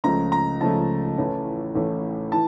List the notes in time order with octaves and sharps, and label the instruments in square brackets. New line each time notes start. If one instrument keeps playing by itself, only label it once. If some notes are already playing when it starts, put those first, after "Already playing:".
[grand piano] C#2 C#3 F3 A3 A#5
A#5
C#2 C#3 F3 A3 A5
A1 A2 E3 A3 C#4
A1 A2 E3 A3 C#4
E3 A5